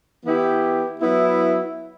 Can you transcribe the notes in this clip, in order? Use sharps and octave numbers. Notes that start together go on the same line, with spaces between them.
E3 B3 E4 G4
F#3 B3 E4